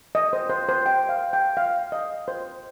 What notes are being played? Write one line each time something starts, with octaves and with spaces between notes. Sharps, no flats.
D#5
C5
C5
C5
G5
F5
G5
F5
D#5
C5